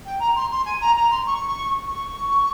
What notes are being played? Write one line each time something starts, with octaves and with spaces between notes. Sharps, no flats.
G5
A#5
C6
C6
G#5
A#5
A#5
C6
C#6
C#6